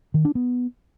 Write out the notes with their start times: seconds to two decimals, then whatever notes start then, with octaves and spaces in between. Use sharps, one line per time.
0.14 D#3
0.25 D4
0.35 B3